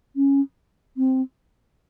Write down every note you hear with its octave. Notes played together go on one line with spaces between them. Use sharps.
C#4
C4